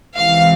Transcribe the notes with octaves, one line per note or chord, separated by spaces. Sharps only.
C#2 C3 E3 F5